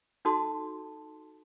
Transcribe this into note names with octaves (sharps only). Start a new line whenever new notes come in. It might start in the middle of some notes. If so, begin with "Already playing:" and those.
D#4 F#4 A4 A5 C6 D#6